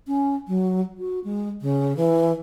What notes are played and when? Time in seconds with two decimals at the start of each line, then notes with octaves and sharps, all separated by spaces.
0.07 C#4
0.48 F#3
0.98 F#4
1.24 G#3
1.61 C#3
1.97 E3